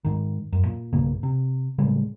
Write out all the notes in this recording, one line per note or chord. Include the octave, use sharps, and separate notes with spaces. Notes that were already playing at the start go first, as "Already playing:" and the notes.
G#2 D#3
F#2
A#2
B1 G2 C#3 A#3
C3
A2 C#3 G3 G#3